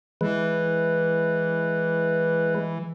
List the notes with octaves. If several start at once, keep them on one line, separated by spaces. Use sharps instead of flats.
E3 G#3 B4